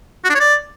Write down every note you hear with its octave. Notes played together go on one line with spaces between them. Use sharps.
F#4
D4
C#5
D5